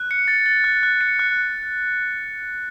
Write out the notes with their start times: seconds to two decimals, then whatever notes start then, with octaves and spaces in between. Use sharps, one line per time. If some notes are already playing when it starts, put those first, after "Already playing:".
Already playing: F#6
0.11 C#7
0.28 A6
0.46 A6
0.64 F#6
0.83 F#6
1.01 C#7
1.19 F#6